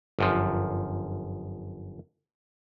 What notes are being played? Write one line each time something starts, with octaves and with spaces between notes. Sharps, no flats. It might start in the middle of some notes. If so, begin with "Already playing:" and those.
G1 F#2 F3